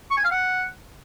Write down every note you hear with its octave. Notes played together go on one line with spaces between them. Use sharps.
C#6
G#5
F5
F#5